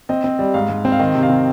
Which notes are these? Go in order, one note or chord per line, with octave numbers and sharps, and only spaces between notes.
C4 D#5
C4
G3
G#2 F5
G#2
C4
F5
D#3 D#5
C3
F5
C3